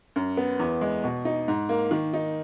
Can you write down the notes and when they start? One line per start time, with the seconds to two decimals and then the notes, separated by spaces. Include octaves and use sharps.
0.16 F#2
0.37 B3
0.60 E2
0.81 G#3
1.04 B2
1.25 D#4
1.48 G#2
1.69 A#3
1.91 D#3
2.13 D#4